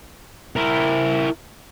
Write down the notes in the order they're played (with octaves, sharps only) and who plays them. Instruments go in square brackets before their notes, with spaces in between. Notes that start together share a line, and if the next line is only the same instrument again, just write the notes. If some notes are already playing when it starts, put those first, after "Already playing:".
[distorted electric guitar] E4 A#4